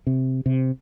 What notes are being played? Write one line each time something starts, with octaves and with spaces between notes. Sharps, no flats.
C3
C3